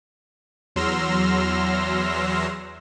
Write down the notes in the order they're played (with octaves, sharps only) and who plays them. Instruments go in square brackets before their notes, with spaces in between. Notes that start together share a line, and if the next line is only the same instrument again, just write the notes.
[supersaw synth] E2 F#3 C6 E6 F6 A#6